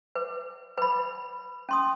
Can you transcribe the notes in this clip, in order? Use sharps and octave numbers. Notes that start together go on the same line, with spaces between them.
B4
B4 B5
C#4 C6 D#6